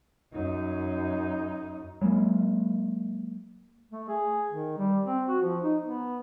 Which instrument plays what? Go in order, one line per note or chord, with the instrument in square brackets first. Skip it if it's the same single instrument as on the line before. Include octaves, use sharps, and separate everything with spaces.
[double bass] F#2 D#4
[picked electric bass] F#3 G#3 A#3
[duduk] A3
G#4
D#3
G3
C4
F#4
F3
D#4
B3